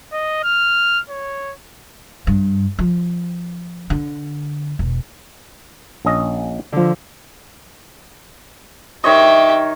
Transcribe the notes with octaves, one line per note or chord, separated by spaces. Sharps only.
D#5
F6
C#5
G2
F3
D3
E1
A#1 C#4 D#5
D3 F3
D#3 G4 C#5 D#5 E5